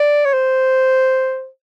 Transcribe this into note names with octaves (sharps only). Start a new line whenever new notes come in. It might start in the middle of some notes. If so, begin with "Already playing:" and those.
Already playing: D5
C#5
C5